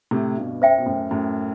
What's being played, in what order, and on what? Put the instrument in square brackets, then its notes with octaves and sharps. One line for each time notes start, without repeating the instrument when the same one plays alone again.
[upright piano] A2 C3
G2 B2
[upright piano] F#2 [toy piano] C5 E5 G5
[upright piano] B2
F#2 A2
F#2 A2